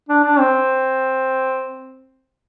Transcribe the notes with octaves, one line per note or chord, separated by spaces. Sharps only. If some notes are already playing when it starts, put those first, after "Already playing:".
D4
D4
C4